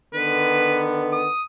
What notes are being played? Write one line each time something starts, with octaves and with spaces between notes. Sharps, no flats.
D3 D#3 B3 B4
D#6